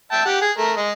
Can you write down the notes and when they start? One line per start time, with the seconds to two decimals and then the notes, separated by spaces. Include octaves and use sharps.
0.12 E5 G5 A5
0.25 G4 F#5
0.42 G#4
0.58 A3 A#4
0.77 G#3 D#5